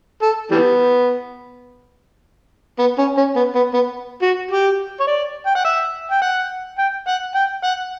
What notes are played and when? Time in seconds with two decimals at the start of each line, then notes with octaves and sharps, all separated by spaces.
0.22 A4
0.51 E3 G3 B3
2.79 B3
2.98 C#4
3.17 C#4
3.36 B3
3.55 B3
3.74 B3
4.22 F#4
4.51 G4
5.00 C#5
5.07 D5
5.46 G5
5.55 F#5
5.65 E5
6.11 G5
6.21 F#5
6.78 G5
7.07 F#5
7.35 G5
7.63 F#5